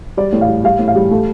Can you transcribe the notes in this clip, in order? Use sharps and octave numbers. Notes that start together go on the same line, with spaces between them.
G3 D5
A2
F5
G3
G3 F5
A2
F5
G3
A3